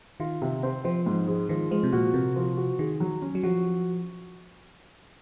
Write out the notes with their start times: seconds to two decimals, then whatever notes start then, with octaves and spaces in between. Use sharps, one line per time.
0.20 D#3 F4
0.42 C3
0.63 C4
0.85 F3 C4
1.06 G#2
1.28 G#3
1.49 D#3 F3
1.71 F3 G#3
1.83 C3
1.92 A#2 F#4
2.14 C3 A#4
2.36 F3
2.57 F#4
2.79 D#3 G#4
3.00 F#3
3.22 C#4
3.35 F#3
3.43 F3 F#4